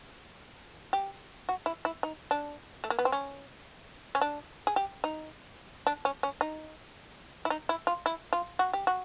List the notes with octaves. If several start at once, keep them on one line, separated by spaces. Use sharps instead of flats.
G4
F#4
E4
E4
D#4
D4
A3
A#3
B3
C4
C#4
C#4
D4
G#4
G4
D#4
D4
C#4
C#4
D#4
E4
D#4
E4
F4
E4
F4
F#4
G4
F#4